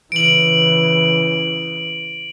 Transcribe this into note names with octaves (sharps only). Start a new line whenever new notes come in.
C#3 E3 D7 F#7